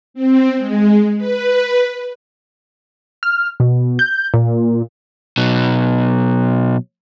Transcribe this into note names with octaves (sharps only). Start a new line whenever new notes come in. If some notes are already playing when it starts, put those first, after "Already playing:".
C4
G#3
B4
F6
B2
G6
A#2
B2 F#3